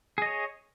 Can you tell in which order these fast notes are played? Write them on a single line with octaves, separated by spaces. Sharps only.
G#4 D#5 C#5